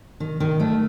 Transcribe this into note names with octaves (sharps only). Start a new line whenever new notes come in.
D#3
D#3
A3